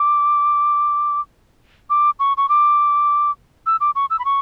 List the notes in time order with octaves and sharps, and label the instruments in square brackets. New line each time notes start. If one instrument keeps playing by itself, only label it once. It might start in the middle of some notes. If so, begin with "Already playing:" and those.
Already playing: [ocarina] D6
D6
C#6
C#6
D6
E6
D6
C#6
E6
B5
C#6